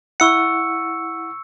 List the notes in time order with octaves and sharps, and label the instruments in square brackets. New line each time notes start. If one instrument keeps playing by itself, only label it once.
[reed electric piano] E4 F#5 [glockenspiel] C#6 E6 C#7